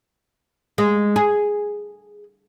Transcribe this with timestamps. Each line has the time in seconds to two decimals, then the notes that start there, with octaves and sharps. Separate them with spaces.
0.78 G#3
1.16 G#4